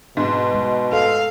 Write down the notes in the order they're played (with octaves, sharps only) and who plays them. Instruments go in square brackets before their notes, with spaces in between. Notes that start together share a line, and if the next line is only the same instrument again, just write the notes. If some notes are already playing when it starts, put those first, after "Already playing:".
[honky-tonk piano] G#2 [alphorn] B2
[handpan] G#3
[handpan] A4 [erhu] F5